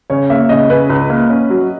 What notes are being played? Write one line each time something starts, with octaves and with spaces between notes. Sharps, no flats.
C#3 C#5
A#3 E5
C#3 D#5
C#3 B4
C#2
A#3
C#4
F#3